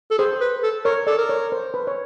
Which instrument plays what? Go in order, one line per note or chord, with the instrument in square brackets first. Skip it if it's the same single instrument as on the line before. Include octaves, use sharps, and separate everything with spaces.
[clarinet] A4
[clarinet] G#4 [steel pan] C5
[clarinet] B4
A4
[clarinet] A#4 [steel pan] C#5
[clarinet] A4 [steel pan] D5
[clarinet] A#4
[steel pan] C#5
C5
B4
C#5